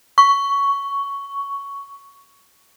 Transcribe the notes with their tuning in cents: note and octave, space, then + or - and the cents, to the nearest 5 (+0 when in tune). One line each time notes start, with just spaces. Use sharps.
C#6 +10